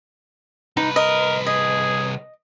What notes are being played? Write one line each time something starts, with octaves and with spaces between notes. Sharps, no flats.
C2 D#4 B4
A#4 D#5
G#4 D#5